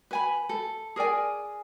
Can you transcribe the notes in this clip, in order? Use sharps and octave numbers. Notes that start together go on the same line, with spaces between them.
B4 G#5 B5
A4
G#4 A#4 D5 G#5